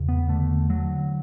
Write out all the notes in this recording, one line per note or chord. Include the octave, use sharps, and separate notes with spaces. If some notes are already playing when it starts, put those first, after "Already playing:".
Already playing: E2 C#3
B3
D3 A3
D3 F#3